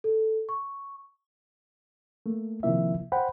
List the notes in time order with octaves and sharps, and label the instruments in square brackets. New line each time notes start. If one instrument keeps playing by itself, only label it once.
[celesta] A4
C#6
[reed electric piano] A3 A#3
C3 D#3 F3 A#3 E4 E5
C5 F#5 G5 B5